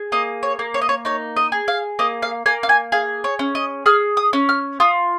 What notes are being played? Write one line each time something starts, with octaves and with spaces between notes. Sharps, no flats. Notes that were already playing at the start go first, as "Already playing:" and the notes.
Already playing: G#4
A#3 D#5
C#5
A#3
C#5
D#5
C#5
D#4 C#5
D#5
G#4
F5
A#3 D#5
F5
A#3 G#5
F5
G#5
G#4 F5
C#5
C#4
D#5
G#4 F6
D#6
C#4
F6
F4 D#6